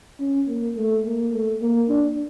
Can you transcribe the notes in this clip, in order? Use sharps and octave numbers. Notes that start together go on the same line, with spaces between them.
C#4
A#3
A3
A#3
A3
A#3
D4